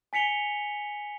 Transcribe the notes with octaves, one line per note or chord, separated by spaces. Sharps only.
G#5 B6 C#7 F7 G7